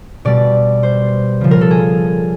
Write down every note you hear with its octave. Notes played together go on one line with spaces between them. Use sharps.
B2 G3 D5
C5
C#3 F3
A#4
A4
G#4